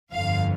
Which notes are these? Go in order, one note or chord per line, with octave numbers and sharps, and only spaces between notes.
G1 F2 D3 F5